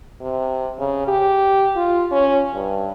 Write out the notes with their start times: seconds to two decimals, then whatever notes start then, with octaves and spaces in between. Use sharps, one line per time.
0.21 C3
0.79 C#3
1.08 G4
1.76 F4
2.11 C#4
2.54 G2